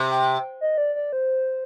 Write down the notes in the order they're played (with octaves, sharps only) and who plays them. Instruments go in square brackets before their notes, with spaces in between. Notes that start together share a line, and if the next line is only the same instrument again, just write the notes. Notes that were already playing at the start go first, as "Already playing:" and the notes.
Already playing: [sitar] C3
[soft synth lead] G5
D#5
D5
D5
C5